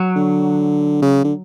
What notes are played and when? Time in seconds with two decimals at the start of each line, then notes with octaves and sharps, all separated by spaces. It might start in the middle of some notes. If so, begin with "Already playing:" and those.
Already playing: F#3
0.16 D3
1.02 C#3
1.24 D3